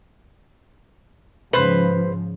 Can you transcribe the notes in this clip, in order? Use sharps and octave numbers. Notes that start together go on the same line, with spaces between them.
G#2 C#3 F3 B4 C5